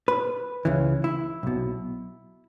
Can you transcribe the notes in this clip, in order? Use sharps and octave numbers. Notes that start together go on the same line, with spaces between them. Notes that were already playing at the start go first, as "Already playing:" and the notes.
B4
C#2 C#3 E3
E4
B1 B2